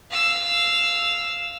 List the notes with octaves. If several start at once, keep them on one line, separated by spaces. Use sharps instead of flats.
F5 E6